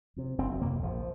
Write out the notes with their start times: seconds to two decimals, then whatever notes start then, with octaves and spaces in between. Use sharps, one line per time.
0.16 F2 C3
0.38 F#1 C4
0.61 F2 C3 A#3
0.82 A#1 F3